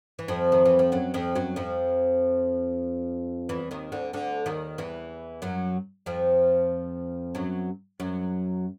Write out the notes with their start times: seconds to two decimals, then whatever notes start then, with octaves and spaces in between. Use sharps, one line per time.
0.19 E3
0.28 F2 F3
0.52 D#3
0.65 E3
0.79 F3
0.92 F#2 F#3
1.14 F2 F3
1.35 F#2 F#3
1.56 F2 F3
3.49 E2 E3
3.71 D#2 D#3
3.92 D2 D3
4.13 D2 D3
4.46 D#2 D#3
4.78 E2 E3
5.42 F#2 F#3
6.06 F2 F3
7.35 F#2 F#3
8.00 F#2 F#3